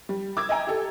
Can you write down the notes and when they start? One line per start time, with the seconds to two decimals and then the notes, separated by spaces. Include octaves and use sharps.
0.09 G3
0.37 D6 E6 G#6
0.49 D#5 E5 G5 G#5 A#5
0.67 G4 A4